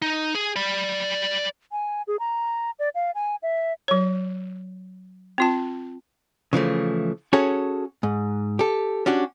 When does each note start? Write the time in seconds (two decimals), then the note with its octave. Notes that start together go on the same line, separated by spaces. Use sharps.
0.02 D#4
0.35 G#4
0.56 D5 B5
1.72 G#5
2.07 G#4
2.20 A#5
2.79 D5
2.95 F5
3.15 G#5
3.43 E5
3.88 F#3 C#5
5.38 C4 F4 A5
6.53 C#3 E3 F3 A3
7.33 C#4 F#4 G#4 A4 C#5 G#5
8.03 G#2
8.59 G4 A4
9.06 C#4 D4 F#4 G4